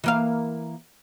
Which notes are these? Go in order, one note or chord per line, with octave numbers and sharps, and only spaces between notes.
E3 A#3 F5